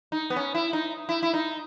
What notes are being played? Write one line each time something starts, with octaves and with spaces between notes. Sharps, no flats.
D#4
B3
C#4
E4
D#4
E4
E4
D#4